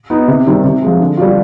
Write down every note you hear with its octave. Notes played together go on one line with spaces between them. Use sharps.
B3 D#4
C3
D#3 G3 C4
C3
F3 G#3
D3
G3 D4 F4